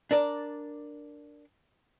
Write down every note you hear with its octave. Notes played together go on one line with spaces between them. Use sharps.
D4 A#4 D5